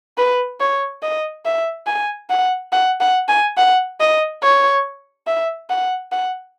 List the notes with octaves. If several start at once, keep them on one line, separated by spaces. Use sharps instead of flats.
B4
C#5
D#5
E5
G#5
F#5
F#5
F#5
G#5
F#5
D#5
C#5
E5
F#5
F#5